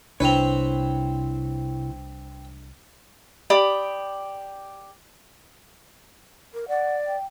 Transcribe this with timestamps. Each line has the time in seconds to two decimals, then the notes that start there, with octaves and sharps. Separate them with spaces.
0.20 C2 C3 C4 D4 E4 B4 C#5 F7
3.50 G4 D5 B5 D#6
6.54 A#4
6.69 D5 F#5
7.06 G5